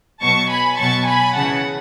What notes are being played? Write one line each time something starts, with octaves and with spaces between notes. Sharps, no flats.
B2 F#3 A5 C#6
G#5 B5
B2 F#3 A5 C#6
G#5 B5
C#3 E3 F#5 A5